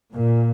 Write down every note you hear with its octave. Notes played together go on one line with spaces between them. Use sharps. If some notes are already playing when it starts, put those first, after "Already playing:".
A#2